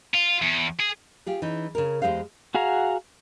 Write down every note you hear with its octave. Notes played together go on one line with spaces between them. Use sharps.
F4
E2
G#4
F4 G4 G#4
E3 C#4 D#4
C#3 G#4 A#4
E2 C#3 G#3 G4 C5 F5
F#4 G#4 F5 F#5 A#5